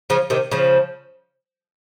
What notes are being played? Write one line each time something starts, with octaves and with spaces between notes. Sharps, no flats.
C#3 F3
C3 D#3
C#3 F3